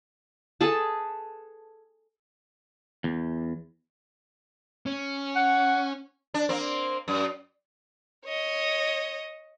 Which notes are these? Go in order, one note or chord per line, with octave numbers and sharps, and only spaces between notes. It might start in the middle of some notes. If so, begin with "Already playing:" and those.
G#4 A4 B4 A5
E2
C#4
F#5
D4
A#3 C4
F#2
C#5 D#5